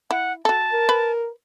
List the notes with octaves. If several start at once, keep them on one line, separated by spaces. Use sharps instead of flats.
E4 F#5
F#4 A4 A5
A#4
B4